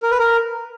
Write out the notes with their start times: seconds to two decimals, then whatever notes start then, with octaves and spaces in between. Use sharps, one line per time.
0.03 A#4
0.11 B4
0.19 A#4